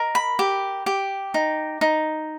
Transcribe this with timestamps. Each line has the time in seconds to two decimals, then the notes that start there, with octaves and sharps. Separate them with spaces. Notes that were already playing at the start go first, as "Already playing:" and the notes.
Already playing: A#4 D#5
0.15 B5
0.39 G4
0.86 G4
1.34 D#4
1.81 D#4